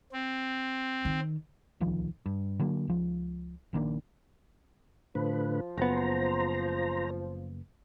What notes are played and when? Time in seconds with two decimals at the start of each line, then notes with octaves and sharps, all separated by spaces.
0.13 C4
1.05 D#3
1.80 D1 C2 D#3 F3
2.26 G2
2.59 D3 F#3 A#3
2.88 C#2 F3
3.73 A#1 D#3 A#3 D4
5.15 A2 D3 F3 B4
5.78 F#1 B3 C5 A#5